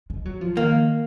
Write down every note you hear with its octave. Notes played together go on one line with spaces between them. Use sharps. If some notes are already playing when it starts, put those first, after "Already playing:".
G#3
F#3
F3
D#3 A#3